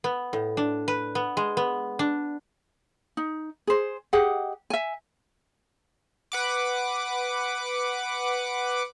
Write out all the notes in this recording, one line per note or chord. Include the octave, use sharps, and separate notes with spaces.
B3
A2
D4
B4
B3
G#3
B3
D4
D#4
G#4 C5
G4 G#4 D#5 F#5
E5 G#5
B4 F#5 D6